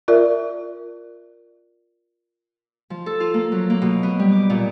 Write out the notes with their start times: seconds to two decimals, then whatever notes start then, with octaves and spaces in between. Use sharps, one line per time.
0.08 F4 A#4 D5 E5
2.90 F3
3.06 A4
3.20 F4
3.34 A#3
3.52 F#3
3.70 A#3
3.82 B2
4.03 B3
4.19 G3
4.32 D6
4.50 A#2